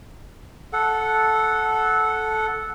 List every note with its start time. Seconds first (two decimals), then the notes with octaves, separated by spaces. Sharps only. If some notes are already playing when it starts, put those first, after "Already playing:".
0.73 A4 F#5